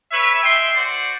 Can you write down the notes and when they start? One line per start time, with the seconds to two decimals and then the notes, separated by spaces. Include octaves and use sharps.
0.10 B4 C#5 E5
0.42 G#3 E5 G5 C6
0.75 F#4 C5 D5 F#5